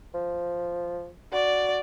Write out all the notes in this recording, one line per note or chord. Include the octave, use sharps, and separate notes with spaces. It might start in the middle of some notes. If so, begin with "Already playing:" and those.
F3
F#4 D5